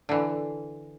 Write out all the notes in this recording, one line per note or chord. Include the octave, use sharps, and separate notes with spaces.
D3 E3